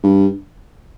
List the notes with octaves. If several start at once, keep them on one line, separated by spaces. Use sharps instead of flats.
G2